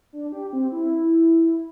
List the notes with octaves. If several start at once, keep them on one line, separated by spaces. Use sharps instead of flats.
D4
G4
C4
E4